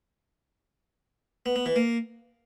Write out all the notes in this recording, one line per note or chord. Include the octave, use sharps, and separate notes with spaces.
B3
B3
E3
A#3